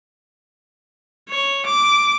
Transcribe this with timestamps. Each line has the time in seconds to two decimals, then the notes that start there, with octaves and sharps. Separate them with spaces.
1.29 C#5
1.66 D6